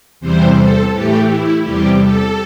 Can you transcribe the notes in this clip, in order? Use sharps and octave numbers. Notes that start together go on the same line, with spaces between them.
E2 C3 E3 G3 C5
A4
A2 E3 A3 G4
E4
E2 C3 G3 G4
A4